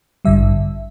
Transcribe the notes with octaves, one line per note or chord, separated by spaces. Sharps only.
A1 G2 D3 G3 E5